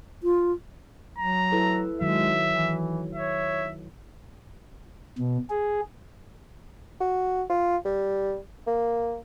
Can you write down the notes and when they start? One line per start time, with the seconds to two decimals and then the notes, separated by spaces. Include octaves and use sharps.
0.23 F4
1.18 F#3 A#5
1.52 E4 A4 B4
2.01 D#3 F#3 G#3 E5
2.51 E3
3.15 C#5 E5
5.19 B2
5.50 G#4
7.01 F#4
7.50 F4
7.85 G3
8.67 A#3